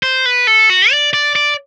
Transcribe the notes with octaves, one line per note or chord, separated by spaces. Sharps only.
C5
B4
A4
F#4
D5
D5
D5